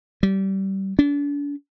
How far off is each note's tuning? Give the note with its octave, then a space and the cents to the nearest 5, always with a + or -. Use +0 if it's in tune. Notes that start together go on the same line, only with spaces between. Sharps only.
G3 -25
D4 -40